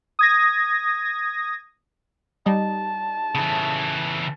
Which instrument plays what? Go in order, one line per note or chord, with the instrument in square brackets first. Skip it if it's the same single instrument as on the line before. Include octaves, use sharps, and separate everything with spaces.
[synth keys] D#6 G#6 A#6
[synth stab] G3 D#4 [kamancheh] A5
[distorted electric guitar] C#3 E3